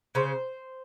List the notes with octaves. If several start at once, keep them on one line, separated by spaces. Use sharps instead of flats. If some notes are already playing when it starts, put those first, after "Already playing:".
C#3 C5